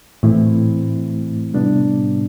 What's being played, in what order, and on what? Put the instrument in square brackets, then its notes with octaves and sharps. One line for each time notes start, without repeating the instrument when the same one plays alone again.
[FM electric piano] A2 [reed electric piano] E3 A3 C4 E4
[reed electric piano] C3 G3 B3 D4